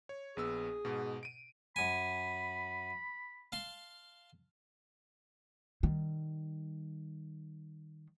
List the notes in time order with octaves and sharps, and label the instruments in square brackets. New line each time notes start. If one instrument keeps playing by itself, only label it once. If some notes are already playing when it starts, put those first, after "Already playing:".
[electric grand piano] C#5
[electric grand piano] A#1 B3 E6 [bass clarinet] G#4
[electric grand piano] G#2 B2
D7 D#7
[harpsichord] F#2 G#5 [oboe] B5
[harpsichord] F5 A5 C6
[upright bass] D#3 G3